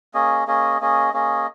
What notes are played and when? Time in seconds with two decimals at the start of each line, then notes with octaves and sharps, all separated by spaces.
0.14 A#3 C#4 G#4 D#5
0.47 A#3 C#4 G#4 D#5
0.81 A#3 C#4 G#4 D#5
1.13 A#3 C#4 G#4 D#5